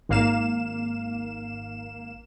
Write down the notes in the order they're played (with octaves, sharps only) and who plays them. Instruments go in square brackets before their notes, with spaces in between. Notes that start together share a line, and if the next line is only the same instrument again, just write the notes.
[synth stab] G#1 A#3 F5 E7